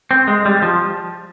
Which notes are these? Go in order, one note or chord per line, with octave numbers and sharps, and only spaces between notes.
C4
G#3
G3
F3